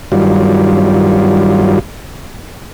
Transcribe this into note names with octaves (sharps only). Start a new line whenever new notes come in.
G2 D#3 F#3 G3 F4